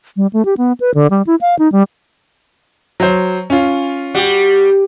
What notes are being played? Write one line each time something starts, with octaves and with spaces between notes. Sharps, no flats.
G3
A3
G4
B3
B4
D3
G3
E4
F5
D#4
G3
F#3 C5
C#4 F4
G3 F#4 G4